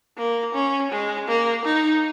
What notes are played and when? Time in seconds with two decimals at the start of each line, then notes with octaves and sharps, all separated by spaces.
0.18 A#3
0.54 C#4
0.91 G#3
1.28 A#3
1.65 D#4